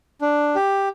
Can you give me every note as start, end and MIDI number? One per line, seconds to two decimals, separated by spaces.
0.21 0.55 62
0.55 0.89 67